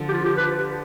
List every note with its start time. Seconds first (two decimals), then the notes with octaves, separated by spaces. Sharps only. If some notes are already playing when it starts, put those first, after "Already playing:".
Already playing: D3 F3
0.09 G4
0.13 F4
0.25 G4
0.37 B4